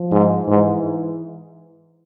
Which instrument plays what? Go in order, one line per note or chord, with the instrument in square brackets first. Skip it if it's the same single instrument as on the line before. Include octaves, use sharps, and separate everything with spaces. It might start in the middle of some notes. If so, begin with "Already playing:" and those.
Already playing: [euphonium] F3
[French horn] G#2
[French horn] G#2 [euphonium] E3